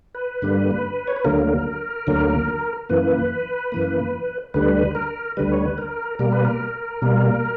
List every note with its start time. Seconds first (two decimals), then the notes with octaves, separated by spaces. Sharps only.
0.15 B4
0.42 G2 D3 G3 A#3
1.08 C#5
1.16 B4
1.25 D2 D3 F#3 A#3 A#4
2.07 D2 D3 F#3 A#3
2.89 F#2 E3 A#3 B4
3.72 F#2 E3 A#3
4.54 D2 D3 G3 B4
4.95 A#4
5.37 D2 D3 G3 B4
5.52 C#5
5.65 B4
5.78 A#4
6.19 B2 G3 A#3 A#4
6.32 B4
6.45 A#4
7.02 B2 G3 A#3